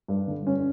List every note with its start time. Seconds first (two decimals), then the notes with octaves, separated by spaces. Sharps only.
0.08 G2
0.28 D3
0.47 C#4